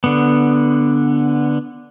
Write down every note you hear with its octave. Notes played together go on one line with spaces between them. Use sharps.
D3 B3